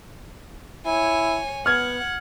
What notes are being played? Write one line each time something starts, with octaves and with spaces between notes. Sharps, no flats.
E4 C#5 G#5
B3 F#5 F6 G#6